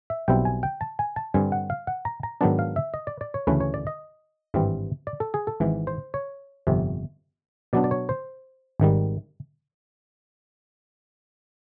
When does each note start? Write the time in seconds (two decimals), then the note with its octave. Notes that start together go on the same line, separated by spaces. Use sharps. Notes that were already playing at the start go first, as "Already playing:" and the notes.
0.10 E5
0.28 B1 B2 G3 C4 E4 G5
0.45 G#5
0.63 G5
0.81 A5
0.99 G#5
1.16 A5
1.34 G2 D3 G3 C4 G#5
1.52 F#5
1.70 F5
1.87 F#5
2.05 A#5
2.23 A#5
2.41 G#2 D#3 F#3 B3 D4 A5
2.59 F5
2.76 E5
2.94 D#5
3.07 D5
3.21 D5
3.34 C#5
3.47 D2 C#3 E3 A3 C#4 B4
3.60 C#5
3.74 D5
3.87 D#5
4.54 G#1 G2 E3 G3 C4
5.07 D5
5.20 A4
5.34 G#4
5.47 A4
5.60 G#1 G#2 E3
5.87 C5
6.14 C#5
6.67 G1 F2 C3
7.73 B2 F#3 B3 D4 D5
7.84 D5
7.91 C#5
8.09 C5
8.80 G#1 G#2 D#3 G3